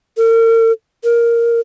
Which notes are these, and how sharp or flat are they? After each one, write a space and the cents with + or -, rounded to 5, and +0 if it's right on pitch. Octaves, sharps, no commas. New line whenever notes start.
A#4 -40
A#4 +5